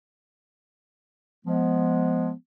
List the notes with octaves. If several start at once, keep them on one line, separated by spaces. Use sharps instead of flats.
F3 G#3 B3